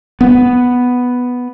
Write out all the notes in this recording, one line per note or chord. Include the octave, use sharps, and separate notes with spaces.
B3